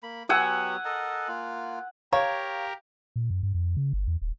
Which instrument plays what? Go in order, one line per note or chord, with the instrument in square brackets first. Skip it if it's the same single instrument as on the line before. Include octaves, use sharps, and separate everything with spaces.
[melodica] A#3 B5
[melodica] F#3 B3 G4 [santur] F#5 G#5 E6
[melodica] A4 A#4 D#5
A#3 F4
[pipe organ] G4 A#4 [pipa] C#5 [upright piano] F5 [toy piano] A#5
[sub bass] A#2
F#2
G2
F2
C#3
G1
E2
D#1